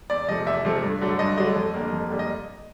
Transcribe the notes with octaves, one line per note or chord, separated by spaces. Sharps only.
E2 D5
C3 F3 A3 D#5
E2 E5
C3 F3 A3
G2
D3 F#3 A3
G2 D#5
D3 F#3 A3 D#5
F2
D3 G3 A#3
F2
D3 G3 A#3
D#5